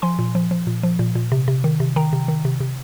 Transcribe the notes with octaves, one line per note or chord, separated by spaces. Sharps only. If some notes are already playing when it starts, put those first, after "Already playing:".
F3 G#5 C6
A#2
F3
F3
A#2
F3
A#2
A#2
C3
C3
D#3
C3
D#3 G5 A#5
C3
D#3
C3
C3